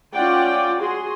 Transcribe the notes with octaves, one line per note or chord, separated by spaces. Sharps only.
C#4 F4 D5 F#5 G5
F#4 G#4 C6